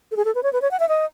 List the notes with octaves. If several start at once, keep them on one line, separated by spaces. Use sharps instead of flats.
A4
G#4
A4
B4
C#5
B4
C#5
F#5
E5
D#5